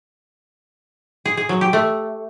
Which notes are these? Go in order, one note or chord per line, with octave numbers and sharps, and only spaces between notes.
G#4
G#4
F#3
G4
A3